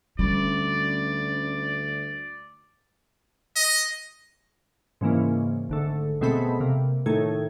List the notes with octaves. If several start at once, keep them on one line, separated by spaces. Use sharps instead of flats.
D2 G3 C#4 D5 B5
D#5
G#2 C#3 E3 A#3
G#1 D3 A3
B2 G#3 A3 C4 A4 B5
C3 A#3
A2 D#3 A3 G#6